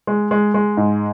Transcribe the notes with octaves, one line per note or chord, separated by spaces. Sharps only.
G#3
G#3
G#3
G#2